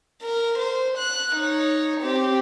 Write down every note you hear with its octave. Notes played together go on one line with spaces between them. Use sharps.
A#4
C5
F#6
D#4 C#5
C4 G4